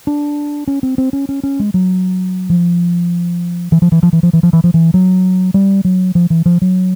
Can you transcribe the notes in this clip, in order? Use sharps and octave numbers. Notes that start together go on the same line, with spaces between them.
D4
C#4
C4
C4
C#4
C#4
C#4
G#3
F#3
F3
E3
F3
E3
F3
E3
F3
E3
F3
E3
F3
E3
F#3
G3
F#3
F3
E3
F3
F#3